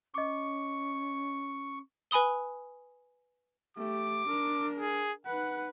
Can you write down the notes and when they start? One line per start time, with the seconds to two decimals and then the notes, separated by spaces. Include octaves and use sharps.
0.14 C#4 D#5 C#6 D6
2.11 B4 G#5 B5 D#6 G7
3.77 A3 G4 D6
4.27 D4 A#4
4.79 G#4
5.26 D#4 B4 F#5